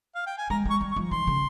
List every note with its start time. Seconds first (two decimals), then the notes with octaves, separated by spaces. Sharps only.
0.15 F5
0.26 G5
0.38 G#5
0.50 G#3 A#5
0.65 G#3 C#6
0.81 G3
0.91 C#6
0.96 F3
1.11 D#3 C6
1.27 C#3